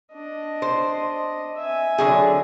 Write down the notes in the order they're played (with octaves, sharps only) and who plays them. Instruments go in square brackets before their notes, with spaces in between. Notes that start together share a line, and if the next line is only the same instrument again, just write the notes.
[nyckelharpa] D4 D#5
[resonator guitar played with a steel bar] C5
[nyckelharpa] E5 G#5
[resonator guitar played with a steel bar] D3 F#3 G#4